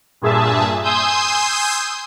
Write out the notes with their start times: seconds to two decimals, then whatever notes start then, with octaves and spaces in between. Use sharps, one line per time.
0.21 G2 A#2 G#4 E5 A5
0.83 G#5 C6 D#6 E6 G6